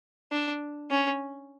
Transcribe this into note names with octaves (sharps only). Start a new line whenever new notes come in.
D4
C#4